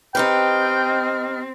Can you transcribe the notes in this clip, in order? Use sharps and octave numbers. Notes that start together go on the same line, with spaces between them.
C4 D#4 G4 B4 D#5 G5 F6